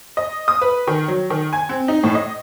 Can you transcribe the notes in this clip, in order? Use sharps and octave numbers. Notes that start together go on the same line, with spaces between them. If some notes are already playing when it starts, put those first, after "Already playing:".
D#5
D#6
B4
D#3
F#3
D#3
G#5
C4
D#4
A2
D#5